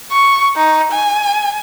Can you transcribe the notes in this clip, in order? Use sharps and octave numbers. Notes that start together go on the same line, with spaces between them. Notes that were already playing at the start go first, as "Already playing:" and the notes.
C#6
D#4
G#5